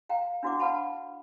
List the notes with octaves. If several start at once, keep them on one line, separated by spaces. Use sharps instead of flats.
F5 G5 A#5
D4 E4 F#4 C5 F#5 D6
B4 F5 F#5 A5 B5